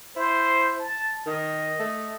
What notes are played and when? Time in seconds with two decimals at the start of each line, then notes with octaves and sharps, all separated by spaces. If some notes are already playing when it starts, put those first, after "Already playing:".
0.16 E4 C5
0.79 A5
1.26 D#3 D#5
1.79 A3